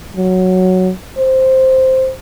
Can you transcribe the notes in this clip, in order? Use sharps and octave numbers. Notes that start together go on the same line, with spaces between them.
F#3
C5